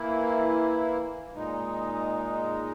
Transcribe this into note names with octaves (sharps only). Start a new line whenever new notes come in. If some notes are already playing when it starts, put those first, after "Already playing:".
Already playing: E3 A#3 E4
A#2 G#3 D#4